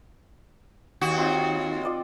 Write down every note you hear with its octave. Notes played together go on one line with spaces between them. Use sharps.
D#2 F#4
C4 D#4 F4
F4 D5 D#5